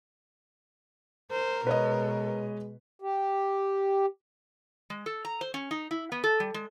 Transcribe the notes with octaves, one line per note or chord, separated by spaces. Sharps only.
A#4 C5
B2 G#3 B4 C#5 D#5
G4
G#3
A4
A#5
C5
C#4
D#4
E4
B3
A4
G3
G#3